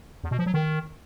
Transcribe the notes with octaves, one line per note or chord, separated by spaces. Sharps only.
E2
B2
F3
F#3
D#3